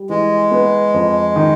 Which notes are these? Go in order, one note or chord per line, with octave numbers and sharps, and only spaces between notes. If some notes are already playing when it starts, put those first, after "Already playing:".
Already playing: G3
E3 G#3
B3
F2
D#3